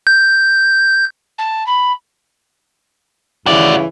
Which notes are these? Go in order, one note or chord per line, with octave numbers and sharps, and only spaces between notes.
G6
A5
B5
G2 C#3 E3 F#4 D5